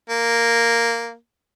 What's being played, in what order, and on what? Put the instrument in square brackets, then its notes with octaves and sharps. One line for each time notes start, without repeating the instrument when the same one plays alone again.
[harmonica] A#3